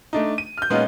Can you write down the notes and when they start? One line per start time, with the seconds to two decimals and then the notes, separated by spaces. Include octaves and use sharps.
0.13 A3 D4 D#4
0.38 D#7
0.58 F6 G6
0.70 A#2 G#3 B3 C#4 D#4 F4